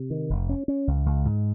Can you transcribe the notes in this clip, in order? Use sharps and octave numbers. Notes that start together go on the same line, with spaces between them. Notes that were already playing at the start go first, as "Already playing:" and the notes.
Already playing: C3
D#3
F1
C#4
C#4
C#2
C#2
G#2